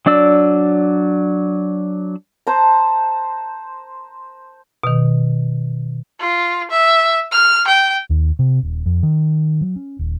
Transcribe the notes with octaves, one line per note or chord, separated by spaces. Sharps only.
F#3 D4 D5 E6
C5 A5 A#5
B2 D#3
F4
E5
F6
G5
D#2
C3
D#1
F2
D#3
F#3
C#4
D#1